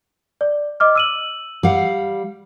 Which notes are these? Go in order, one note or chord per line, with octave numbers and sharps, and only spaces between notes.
D5
D#5 D6 F6
E6 D#7 F#7
G3 F5 F#5